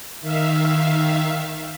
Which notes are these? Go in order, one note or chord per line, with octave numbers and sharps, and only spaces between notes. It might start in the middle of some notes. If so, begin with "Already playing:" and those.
D#3 E5 F5